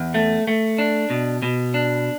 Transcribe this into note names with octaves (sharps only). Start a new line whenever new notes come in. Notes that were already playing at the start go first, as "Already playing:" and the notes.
Already playing: E2
A3
A3
D4
B2
B2
D4